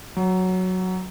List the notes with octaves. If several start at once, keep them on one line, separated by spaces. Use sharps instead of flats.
F#3